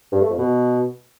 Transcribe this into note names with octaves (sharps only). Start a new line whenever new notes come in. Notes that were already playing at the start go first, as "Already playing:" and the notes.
G2
A3
F2
B2